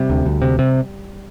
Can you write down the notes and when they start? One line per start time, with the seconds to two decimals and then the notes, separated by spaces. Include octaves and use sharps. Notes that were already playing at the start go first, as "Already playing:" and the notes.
Already playing: C3 G3
0.10 D2
0.26 D2
0.42 C3
0.59 C3